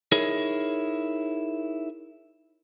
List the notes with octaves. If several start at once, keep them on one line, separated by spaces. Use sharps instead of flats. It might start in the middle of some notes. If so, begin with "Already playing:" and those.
D#4 E4 G#4 A#4 C#5